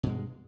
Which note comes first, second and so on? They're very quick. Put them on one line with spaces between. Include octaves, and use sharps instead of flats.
B2 G2 G#3